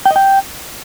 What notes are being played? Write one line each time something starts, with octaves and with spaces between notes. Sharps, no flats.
G5
D#5
G5